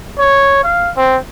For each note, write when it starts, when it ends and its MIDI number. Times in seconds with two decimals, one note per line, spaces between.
0.18 0.61 73
0.63 0.90 77
0.96 1.16 60